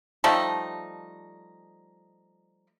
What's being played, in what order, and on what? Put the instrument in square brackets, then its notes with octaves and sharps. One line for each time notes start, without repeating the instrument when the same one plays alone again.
[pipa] F3 G3 A3 D#4